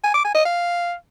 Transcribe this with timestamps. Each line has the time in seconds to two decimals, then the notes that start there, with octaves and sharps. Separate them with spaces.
0.04 G#5
0.14 D6
0.25 G#5
0.35 D#5
0.45 F5